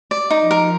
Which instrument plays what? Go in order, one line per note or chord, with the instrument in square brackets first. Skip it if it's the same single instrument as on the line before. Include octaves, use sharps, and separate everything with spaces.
[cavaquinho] D5
D#4
[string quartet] F3
[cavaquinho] A#4